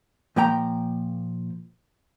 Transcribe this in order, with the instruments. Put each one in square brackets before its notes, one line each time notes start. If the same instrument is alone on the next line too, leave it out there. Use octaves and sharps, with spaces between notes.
[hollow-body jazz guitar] A#2 F3 A#3 G5 A#5